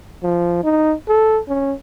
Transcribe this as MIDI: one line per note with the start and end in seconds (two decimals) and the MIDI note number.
0.23 0.60 53
0.64 0.94 63
1.08 1.39 69
1.48 1.73 61